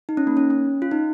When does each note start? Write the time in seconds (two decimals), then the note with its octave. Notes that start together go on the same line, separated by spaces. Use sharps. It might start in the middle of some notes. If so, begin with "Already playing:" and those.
0.09 D#4
0.17 C#4
0.27 A#3
0.37 C#4
0.50 C#4
0.82 F4
0.91 D#4